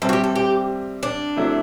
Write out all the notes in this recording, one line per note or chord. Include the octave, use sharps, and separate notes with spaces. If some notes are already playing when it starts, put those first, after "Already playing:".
C3 G3 C4 A4
F#4
G4
A4
G4
D4
C3 F#3 A3 E4